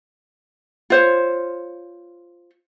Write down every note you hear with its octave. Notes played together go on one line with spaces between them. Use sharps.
F4 C5 C#5